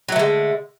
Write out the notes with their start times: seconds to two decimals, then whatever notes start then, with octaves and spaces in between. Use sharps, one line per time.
0.08 F#3
0.12 A3
0.16 D3
0.19 G#3